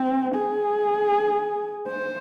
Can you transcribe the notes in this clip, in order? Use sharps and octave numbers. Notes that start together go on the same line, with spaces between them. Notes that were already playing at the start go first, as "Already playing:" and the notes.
Already playing: C4
G#4
C5